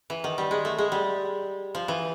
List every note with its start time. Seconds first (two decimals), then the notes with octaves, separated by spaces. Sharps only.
0.10 E3
0.24 D#3
0.38 G3
0.51 G#3
0.65 A3
0.78 G#3
0.92 G3
1.75 F3
1.88 E3